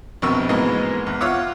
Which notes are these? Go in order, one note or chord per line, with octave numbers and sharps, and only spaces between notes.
A#1 F2 B2 A#4 C#6 E6
G#2 B2 E3 G#3 A#3 D#5
E2
F4 C#5 E5 F#5 D6 E6